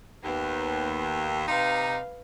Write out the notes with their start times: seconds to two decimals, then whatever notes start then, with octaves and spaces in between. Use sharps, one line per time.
0.23 D#2 B3
1.47 C3 D#4 B4 F5